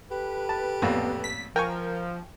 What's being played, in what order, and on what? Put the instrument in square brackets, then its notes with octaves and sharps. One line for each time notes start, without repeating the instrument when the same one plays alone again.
[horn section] G4 A4 B4
[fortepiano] A5
[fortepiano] A1 F2 A#2 [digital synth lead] B3
[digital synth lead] B6
[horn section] F3 [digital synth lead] A#4 [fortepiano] G5 G#5 C#6